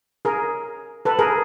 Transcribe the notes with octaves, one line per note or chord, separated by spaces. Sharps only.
G#4 A#4
A4 B4
G#4 A#4